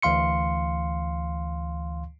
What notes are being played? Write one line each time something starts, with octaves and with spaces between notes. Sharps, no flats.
D2 E3 F5 C6 C#7